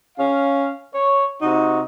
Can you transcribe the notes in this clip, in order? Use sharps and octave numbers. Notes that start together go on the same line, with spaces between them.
C#4 F5
C#5
C3 D#4 F#4